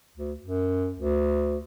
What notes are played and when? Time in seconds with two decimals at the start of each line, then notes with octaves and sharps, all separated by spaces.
0.17 D2
0.41 F#2
0.97 D2